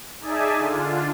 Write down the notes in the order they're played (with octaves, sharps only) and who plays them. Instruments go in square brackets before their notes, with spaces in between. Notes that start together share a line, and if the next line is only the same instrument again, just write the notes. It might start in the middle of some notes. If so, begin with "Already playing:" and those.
[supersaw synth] D#4 G#4 D5 E5 G#5 A5
D3 D4 F4